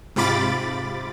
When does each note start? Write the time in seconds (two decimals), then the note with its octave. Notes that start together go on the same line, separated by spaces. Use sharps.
0.16 G#2 C3 F4 B5 D6 A6